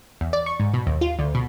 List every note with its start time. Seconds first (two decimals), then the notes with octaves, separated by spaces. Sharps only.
0.21 E2
0.33 D5
0.46 C#6
0.60 G#2
0.74 B2
0.87 D#2
1.01 F4
1.19 D2
1.35 B2